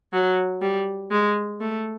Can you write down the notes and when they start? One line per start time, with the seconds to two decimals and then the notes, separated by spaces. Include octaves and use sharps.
0.13 F#3
0.62 G3
1.11 G#3
1.61 A3